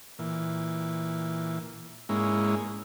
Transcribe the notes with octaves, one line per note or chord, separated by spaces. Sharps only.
A#2 E3
G#2 G#3 A#3 C#4 E4